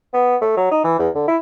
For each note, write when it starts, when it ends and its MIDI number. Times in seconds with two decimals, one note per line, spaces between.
0.13 0.36 59
0.41 0.53 57
0.57 0.69 54
0.71 0.80 63
0.84 0.99 52
0.99 1.09 40
1.15 1.23 50
1.28 1.37 64